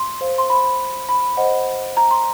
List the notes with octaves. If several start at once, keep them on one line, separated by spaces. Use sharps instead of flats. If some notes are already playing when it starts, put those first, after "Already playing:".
Already playing: C6
C5 F5
C6
B5
B5
C5 D#5 F#5
A#5
C6